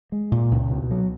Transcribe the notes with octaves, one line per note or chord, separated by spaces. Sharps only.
G#3
A#2
C#2
B2
F#3